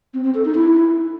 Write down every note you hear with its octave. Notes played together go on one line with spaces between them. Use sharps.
C4
C4
A4
D#4
E4